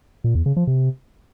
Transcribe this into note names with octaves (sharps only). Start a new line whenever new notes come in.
A#2
E2
C#3
F3
C3